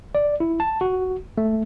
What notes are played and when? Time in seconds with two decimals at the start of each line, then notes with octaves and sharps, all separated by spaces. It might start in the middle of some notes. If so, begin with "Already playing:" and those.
0.15 D5
0.40 E4
0.60 A5
0.81 F#4
1.38 A3